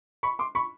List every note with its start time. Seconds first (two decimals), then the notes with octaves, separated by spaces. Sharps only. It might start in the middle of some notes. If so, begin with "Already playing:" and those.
0.23 B5 C#6
0.39 C6 D6
0.55 B5 C#6